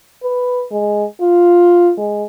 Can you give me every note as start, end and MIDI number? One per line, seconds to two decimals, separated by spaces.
0.24 0.66 71
0.71 1.04 56
1.21 1.92 65
1.97 2.25 56